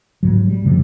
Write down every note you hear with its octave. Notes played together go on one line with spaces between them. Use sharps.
G#2 F#3
G3
F#2 C3 F3 G3